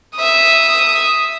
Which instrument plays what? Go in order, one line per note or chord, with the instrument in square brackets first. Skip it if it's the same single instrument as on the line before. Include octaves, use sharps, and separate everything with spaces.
[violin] E5 D#6